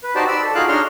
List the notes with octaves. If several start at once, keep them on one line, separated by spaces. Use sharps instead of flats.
B4
D#4 F#4 G4 C5 D5 A5
D5 B5 E6
A4
D#4 F4 F#4 G#4 F5 F#6
D4 D#4 C#5 C6 F6